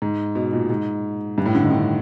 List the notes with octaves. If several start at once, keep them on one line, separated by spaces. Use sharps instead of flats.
G#2
B2
A#2
G#2
G2
A2
D3
D#3
D3